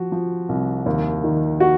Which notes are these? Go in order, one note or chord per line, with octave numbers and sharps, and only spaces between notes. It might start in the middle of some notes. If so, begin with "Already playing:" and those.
Already playing: F3 F#4
F3
C2
D#2
D#3
F#4